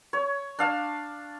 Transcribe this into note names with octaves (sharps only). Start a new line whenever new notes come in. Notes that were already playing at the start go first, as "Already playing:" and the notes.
C#5
D4 F5 A5